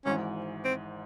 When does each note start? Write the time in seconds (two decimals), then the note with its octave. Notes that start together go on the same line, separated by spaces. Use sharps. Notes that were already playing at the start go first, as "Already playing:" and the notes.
0.06 G#1 G#2 E3 C#4
0.65 C4